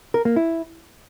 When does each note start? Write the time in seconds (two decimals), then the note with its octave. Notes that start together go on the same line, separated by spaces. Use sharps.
0.14 A#4
0.25 A#3
0.36 E4